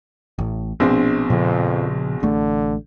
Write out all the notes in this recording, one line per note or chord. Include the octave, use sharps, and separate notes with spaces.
A1 A2
A#1 B2 C4 D4
F2 A#2 C#3 F3
A1 D3 A3